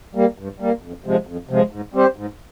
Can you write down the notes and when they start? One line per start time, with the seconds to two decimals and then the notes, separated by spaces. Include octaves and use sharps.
0.15 G3 A#3
0.38 G2
0.60 G3 A#3
0.82 F2
1.04 C3 F3 G#3
1.27 F2
1.49 C3 F3 G#3
1.71 G#2
1.94 G3 C4 G4 C5
2.16 G#2